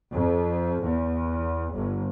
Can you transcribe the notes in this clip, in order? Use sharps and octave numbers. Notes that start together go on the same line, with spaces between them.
F2
E2
G1